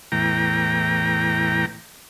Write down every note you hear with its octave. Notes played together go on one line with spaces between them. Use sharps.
E2 A2 G5 A#5